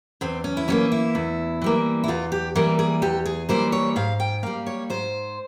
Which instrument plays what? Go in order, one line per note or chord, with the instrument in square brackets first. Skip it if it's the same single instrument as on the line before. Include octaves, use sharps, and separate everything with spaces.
[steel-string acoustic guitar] E2 C4
C#4
E4
E3 G3 A#3 C#4
E4
E2
E3 G3 A#3
E4
E2 F4
G4
E3 G3 A#3 A#4
G#4
E2 G4
G#4
E3 G3 A#3 C5
C#5
G#2 F5
G5
G3 A#3 F5
C#5
G#2 C5